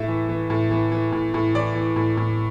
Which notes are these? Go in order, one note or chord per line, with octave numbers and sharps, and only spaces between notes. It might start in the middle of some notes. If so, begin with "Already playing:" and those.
Already playing: A2 E5
E3
E3
A2
E3
E3
A2
A2
E3 D5
E3
A2
A2